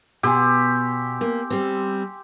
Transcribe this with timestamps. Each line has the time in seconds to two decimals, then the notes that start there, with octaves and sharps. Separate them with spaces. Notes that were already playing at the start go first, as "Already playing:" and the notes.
0.23 B2 G4 G#5 C6 E6
1.21 A#3
1.50 G3 C4